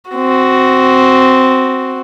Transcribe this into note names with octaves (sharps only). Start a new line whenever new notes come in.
C4 F#4